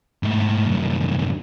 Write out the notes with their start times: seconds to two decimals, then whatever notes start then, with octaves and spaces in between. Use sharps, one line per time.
0.23 G#2 A3
0.68 C2 F#2